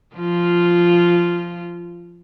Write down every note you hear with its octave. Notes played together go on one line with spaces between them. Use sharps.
F3 F4